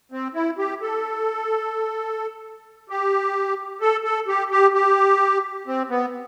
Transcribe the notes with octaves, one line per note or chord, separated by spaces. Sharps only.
C4
E4
G4
A4
G4
A4
A4
G4
G4
G4
C4
B3